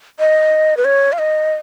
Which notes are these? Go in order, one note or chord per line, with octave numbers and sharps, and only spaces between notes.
D#5
B4
C#5
F5
D#5